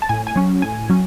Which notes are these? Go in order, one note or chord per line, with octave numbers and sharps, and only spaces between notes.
A5
A2 G#5
G#5
F#3 C#4
A2 G#5
F#3 C#4